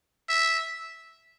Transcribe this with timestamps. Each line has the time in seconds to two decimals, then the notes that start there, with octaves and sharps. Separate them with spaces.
0.29 E5